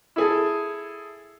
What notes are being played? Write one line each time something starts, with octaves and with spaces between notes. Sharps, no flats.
E4 G#4 A4